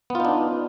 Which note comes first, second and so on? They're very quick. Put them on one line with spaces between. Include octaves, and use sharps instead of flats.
B3 F4 D#4 D4